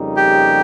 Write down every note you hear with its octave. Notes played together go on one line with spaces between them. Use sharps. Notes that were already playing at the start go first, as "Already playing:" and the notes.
Already playing: F2 C#3 G3 A#3 D#4
G4